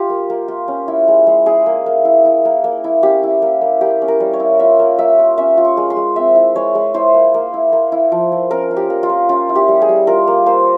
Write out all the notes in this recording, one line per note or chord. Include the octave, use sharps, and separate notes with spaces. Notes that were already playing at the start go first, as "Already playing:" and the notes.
Already playing: F4 G4
A#3
A#3
F4
C#4
E4
G#3
G#3
E4 G#4
A#3
A#3
E4
E4
A#3
A#3
E4
C#4 G4
E4
A#3
A#3
A#3 G4
C#4
A#4
G3
C#5
E4
F4 E5
A#3
A#3 E5
F4
C#4 E5
F4
C#6
G#3
C6
G#3
C4 E5
E4
G#3 C#5
G#3
E4 C5
A#3
A#3
E4
A#3
E4
F3
F3
C#4 A#4
F4
G4
A#3
F4
A#3
C#4 F4
E4
G4
G3
G#4
G3
F4 A#4
A#3
A#3 C5